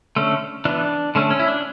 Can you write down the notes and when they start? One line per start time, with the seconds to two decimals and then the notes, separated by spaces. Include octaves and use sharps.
0.16 D3 A3 C#4
0.65 E3 B3 D4
1.15 D3 A3 C#4
1.31 C#4
1.39 E4
1.48 D4